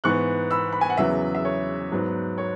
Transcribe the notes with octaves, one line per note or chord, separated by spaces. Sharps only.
G#2 E3 B3 C#6 F#6
B5 E6
B5
G#5
F#5
E2 C#3 F#3 B4 E5
E5
C#5
G#2 F#3 B3
C#5